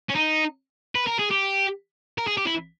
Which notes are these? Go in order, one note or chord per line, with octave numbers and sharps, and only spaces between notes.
C#4
D#4
B4
A#4
G#4
G4
A#4
G#4
G4
E4